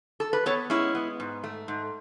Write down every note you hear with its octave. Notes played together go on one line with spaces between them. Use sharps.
A4
B4
B3 A4 C#5
G#3 C#4 E4
B3
G#2
A3
G#2